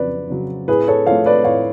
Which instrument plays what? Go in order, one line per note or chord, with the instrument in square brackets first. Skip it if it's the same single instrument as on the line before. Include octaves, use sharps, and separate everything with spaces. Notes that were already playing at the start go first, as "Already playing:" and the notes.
Already playing: [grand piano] F2 C#3 F#3 B4 D5
C#3 F#3
A2 G#4 B4
A4 C#5
F3 A3 C#5 F5
B4 D5
A2 C#5 F5